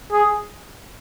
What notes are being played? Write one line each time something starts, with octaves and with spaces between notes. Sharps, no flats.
G#4